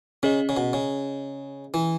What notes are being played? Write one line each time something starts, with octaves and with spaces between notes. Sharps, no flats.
C#3 C#4 G#4 D#5
C#3
B2
C#3
E3